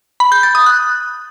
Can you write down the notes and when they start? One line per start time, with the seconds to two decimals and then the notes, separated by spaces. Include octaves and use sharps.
0.20 B5
0.32 G6
0.43 A6
0.55 D#6
0.66 F#6